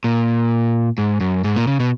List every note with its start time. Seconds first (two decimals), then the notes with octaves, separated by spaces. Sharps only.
0.04 A#2
0.98 G#2
1.20 F#2
1.44 G#2
1.56 A#2
1.67 C#3
1.80 B2